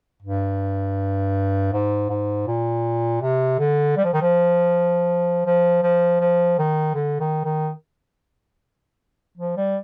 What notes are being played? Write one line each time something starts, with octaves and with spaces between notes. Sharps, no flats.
G2
G#2
G#2
A#2
C3
D3
G3
F3
D#3
F3
F3
F3
F3
D#3
D3
D#3
D#3
F3
G3